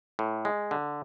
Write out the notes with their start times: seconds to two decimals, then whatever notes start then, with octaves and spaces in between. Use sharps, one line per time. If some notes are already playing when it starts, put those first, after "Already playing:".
0.19 A2
0.45 G#3
0.71 D3